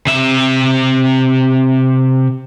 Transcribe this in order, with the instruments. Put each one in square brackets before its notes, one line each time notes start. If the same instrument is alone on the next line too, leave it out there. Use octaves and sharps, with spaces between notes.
[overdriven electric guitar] C3 E5